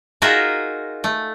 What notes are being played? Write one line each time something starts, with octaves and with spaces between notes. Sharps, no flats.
D#4 F4 F#4 G#4 A#4 E5
A3